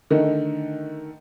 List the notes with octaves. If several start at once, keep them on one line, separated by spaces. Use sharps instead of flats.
D3 D#3 A3